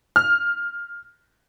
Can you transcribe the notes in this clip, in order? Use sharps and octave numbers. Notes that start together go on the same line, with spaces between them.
F6